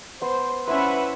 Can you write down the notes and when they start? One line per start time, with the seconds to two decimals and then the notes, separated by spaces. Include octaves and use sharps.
0.22 B3 C5 C6
0.67 C#4 E4 B4 C5 E5 F#5